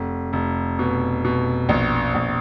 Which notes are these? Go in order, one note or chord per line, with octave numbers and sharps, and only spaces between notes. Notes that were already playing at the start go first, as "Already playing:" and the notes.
Already playing: F1
F1
B2
B2
A#1
A#1